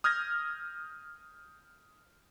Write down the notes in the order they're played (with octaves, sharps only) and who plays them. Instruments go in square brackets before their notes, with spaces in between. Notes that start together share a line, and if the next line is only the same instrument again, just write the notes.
[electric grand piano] D#6 F6 G6 G#6 A#6